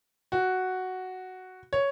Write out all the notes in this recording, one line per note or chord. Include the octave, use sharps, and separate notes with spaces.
F#4
C#5